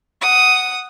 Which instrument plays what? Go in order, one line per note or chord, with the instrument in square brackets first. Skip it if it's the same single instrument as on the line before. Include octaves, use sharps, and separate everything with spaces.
[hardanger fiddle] F#5 D#6